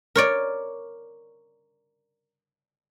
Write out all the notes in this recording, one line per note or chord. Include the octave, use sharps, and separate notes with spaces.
A#4 C#5 D5